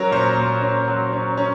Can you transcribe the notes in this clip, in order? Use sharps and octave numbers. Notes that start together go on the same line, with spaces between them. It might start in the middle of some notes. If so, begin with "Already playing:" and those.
Already playing: F#3 C#4 A#4
A#2 C5
A#2
C#4
F#3
C#4
C#4